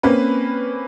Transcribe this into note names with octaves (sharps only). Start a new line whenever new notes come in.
A#3 C4 C#4 B4